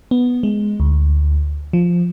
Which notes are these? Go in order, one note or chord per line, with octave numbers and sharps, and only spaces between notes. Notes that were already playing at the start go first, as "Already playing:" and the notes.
B3
G#3
D2
F3